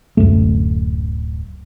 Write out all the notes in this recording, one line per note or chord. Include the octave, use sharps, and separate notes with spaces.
D1 F#2 A3